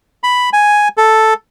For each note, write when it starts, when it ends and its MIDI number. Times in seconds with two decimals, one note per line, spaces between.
0.23 0.50 83
0.53 0.88 80
0.97 1.34 69